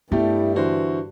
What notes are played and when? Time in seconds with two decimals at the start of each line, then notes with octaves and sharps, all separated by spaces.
0.12 G2 G3 A3 B3 E4 G4
0.56 D3 E3 F#4 C5